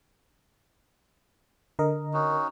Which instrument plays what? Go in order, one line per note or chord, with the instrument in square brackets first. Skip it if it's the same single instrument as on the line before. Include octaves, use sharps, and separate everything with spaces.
[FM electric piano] D3 A#4 D#5
[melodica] C#4 D#4 F#4